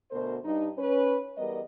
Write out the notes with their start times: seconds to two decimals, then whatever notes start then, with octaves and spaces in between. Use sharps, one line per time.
0.11 D2 B2 A#4 C5
0.45 G2 D#4
0.77 C#4 B4
1.37 E2 G3 B3 A#4 D#5